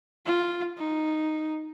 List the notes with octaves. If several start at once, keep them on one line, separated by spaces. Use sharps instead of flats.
F4
D#4